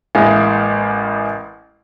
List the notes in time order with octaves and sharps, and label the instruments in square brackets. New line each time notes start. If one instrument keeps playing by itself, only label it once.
[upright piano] A1 G#3 A#3 E4 G#5